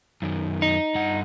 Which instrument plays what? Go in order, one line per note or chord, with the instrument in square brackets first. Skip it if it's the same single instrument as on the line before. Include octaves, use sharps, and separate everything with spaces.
[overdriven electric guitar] F#2 D#3
[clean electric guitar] D#4
[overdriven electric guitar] G2 F#5